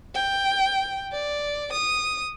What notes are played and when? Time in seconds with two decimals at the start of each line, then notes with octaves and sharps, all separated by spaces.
0.15 G5
1.12 D5
1.72 D#6